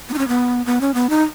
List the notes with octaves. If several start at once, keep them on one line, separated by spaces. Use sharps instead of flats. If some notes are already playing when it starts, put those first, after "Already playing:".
B3
D#4
C#4
B3
B3
C#4
B3
D#4